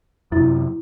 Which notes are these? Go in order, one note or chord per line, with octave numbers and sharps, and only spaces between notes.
F#2 C3 E4